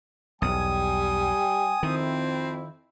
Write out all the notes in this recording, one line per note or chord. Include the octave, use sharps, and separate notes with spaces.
B1 E2 G3 G5 G#5 D#6
F2 D#3 C4 E4